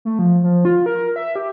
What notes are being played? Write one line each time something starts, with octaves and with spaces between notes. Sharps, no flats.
A3
F3
F3
F4
A#4
E5
G4